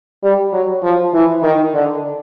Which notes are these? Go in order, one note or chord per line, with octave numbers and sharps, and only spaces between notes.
G3
F#3
F3
E3
D#3
D3